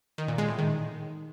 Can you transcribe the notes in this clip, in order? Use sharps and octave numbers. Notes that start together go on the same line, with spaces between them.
D#3
A#2
G#3
A2
D#3